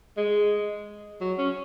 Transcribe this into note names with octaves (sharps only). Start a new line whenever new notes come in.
G#3
F#3
C#4